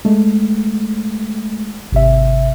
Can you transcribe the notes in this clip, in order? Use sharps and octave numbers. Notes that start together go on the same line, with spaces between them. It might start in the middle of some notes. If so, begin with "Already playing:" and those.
G#3 A3
G#1 C3 E5